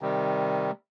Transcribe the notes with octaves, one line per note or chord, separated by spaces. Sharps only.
C3 D#3 G3